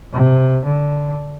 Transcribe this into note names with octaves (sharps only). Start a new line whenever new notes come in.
C3
D3